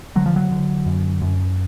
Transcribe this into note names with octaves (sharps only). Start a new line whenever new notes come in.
D3 F#3
F3
F#3
D3
F#2
F#2